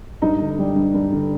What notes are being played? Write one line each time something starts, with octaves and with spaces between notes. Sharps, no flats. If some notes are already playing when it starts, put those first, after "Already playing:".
G2 D#4
D3
G3
G2
G2
D3